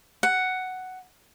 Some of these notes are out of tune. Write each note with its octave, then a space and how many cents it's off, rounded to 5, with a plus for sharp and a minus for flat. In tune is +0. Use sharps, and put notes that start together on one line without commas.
F#5 +5